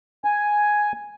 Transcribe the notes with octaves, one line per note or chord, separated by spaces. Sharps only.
G#5